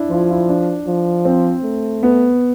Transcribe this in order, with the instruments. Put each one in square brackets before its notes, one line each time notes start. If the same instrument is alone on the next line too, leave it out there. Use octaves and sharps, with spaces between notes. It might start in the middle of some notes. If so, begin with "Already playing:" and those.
Already playing: [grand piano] D4 E4
[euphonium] F3 [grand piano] F4
[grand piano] E4
D4
[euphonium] F3
[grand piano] C4
[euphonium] A3
[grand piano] B3